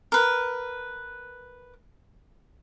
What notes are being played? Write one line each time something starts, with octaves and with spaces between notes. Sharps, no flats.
A#4 B4